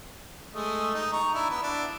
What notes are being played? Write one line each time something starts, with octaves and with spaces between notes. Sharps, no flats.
G#3 A3 D#5
D#4
A#5 C#6
D4 E4
B3 B4
D4 E4